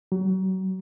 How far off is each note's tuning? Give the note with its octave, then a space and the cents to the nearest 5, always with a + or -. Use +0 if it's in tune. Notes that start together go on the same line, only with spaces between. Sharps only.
F#3 +30